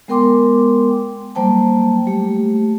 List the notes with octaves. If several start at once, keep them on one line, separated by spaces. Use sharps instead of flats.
G#3 B3 A#4 G5 C6 D6
F#3 G3 A#3 C5 G5 A5
A3 G4